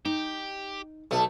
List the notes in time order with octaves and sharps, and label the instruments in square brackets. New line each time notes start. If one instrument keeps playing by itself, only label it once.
[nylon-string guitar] D#4 [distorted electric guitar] G4
[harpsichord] B1 [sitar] A3